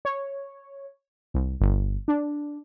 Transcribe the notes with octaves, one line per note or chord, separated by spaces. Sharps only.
C#5
C2
G1
D4